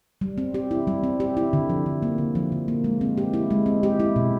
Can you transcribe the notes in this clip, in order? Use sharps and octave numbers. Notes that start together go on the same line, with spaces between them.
G3
C4
G4
E4
G3
C4
G4
E4
D3
F3
D3
A#3
D3
F3
D3
A#3
G#3
C4
G4
E4
G#3
C4
G4
E4
B2